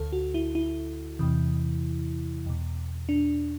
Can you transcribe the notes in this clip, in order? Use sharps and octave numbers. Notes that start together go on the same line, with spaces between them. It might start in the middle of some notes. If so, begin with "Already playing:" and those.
Already playing: D2 D3 A4
F#4
E4
E4
E2 C3 E3
E2 B2
D4